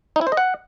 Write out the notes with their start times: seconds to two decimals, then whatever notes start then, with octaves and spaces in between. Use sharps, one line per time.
0.16 D#4
0.21 E4
0.27 C5
0.32 D#5
0.37 F#5